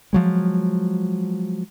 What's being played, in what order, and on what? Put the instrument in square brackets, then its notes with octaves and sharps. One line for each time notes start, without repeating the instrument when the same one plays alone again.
[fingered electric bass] F3 F#3 G#3